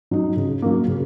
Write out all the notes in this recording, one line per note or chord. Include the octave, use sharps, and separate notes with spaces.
F#3 D#4
C#3
F#3 A#3
C#3